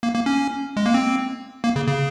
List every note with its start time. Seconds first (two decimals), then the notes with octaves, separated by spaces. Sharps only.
0.03 A#3
0.14 A#3
0.26 C#4
0.77 G#3
0.86 A#3
0.94 C4
1.64 A#3
1.76 C#3
1.87 C#3